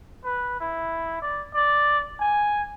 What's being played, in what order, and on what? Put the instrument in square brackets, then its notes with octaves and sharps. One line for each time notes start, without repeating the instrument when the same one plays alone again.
[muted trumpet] B4
E4
D5
D5
G#5